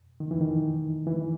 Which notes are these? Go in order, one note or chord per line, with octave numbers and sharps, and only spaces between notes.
D#3
E3
D#3
E3